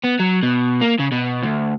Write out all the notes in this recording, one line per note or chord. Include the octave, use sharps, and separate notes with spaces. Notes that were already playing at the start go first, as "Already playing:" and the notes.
B3
F#3
B2
A#3
C#3
B2
D2